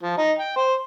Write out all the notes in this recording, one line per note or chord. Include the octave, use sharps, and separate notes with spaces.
F3
D#4
G5
C5